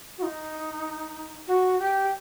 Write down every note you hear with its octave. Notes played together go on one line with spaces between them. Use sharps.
F#4
D#4
F#4
G4